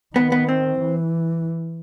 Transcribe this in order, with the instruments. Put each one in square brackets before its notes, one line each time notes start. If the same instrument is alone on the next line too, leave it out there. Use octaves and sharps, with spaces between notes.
[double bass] D#3 [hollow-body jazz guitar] B3
[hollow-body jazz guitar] B3
C4
[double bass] E3